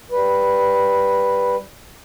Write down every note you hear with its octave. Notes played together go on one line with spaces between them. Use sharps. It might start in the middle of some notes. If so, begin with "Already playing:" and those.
G3 B4